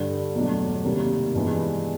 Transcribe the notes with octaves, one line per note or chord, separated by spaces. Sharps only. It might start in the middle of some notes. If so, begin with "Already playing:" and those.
Already playing: G2 D3 G3
E2 B2 F#3 A3 D4
C3 D#3 G3 A#3
G2 E3 G#3 B3